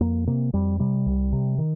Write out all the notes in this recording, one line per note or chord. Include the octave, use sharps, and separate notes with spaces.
F2 A#3
C3 A#3
F2 G3
C3 G3
C2
C3
D#3